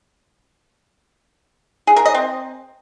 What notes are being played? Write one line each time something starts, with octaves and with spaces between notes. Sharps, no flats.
G#4
A#4
D#5
C4